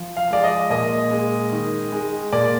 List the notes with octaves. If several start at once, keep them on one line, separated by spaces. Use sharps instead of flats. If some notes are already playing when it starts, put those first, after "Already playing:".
Already playing: F3
F5
G#3 D5
D#5
A#2 D#5
G#3
D#3
G#3
A#2 D5